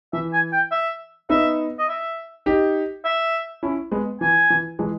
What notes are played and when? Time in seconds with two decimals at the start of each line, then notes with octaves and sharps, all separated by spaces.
0.13 E3 E5
0.33 G#5
0.52 G5
0.72 E5
1.29 B3 D#4 E5
1.79 D#5
1.88 E5
2.46 D#4 G4
3.05 E5
3.63 C#4 E4
3.92 G#3 B3
4.21 E3 G#5
4.50 E3
4.79 E3 G#3